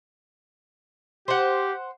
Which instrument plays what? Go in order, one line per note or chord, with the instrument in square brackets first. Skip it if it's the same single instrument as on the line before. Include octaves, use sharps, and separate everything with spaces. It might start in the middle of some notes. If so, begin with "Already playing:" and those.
[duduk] G4 [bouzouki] C5 F#5